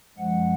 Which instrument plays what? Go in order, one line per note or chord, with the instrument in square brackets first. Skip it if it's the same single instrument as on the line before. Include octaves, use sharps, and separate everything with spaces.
[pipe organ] F#2 F3 G#3 F#5